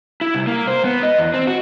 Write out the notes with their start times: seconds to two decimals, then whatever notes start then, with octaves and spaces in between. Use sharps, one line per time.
0.21 E4
0.35 C2
0.47 A#3
0.68 C5
0.84 B3
1.03 D#5
1.18 E2
1.34 C4
1.47 F#4